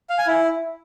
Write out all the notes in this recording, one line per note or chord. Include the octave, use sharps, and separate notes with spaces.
F5
G#5
E4